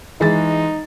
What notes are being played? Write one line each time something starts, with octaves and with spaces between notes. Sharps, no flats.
E3 G#3 D#4 A6